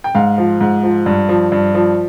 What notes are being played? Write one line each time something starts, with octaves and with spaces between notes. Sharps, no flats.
G5
G#2 F5
F3
G#2
F3
G2
F3
G2
F3